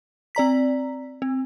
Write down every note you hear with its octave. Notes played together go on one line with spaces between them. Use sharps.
C4 D5 A#5 B6
C4